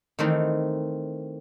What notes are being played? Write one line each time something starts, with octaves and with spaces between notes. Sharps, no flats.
D#3 E3 A3 C4 D#4